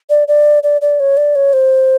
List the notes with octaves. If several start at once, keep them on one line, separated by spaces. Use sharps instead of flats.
D5
D5
D5
D5
C#5
D5
C#5
C5